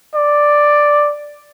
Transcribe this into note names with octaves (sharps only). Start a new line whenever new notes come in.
D5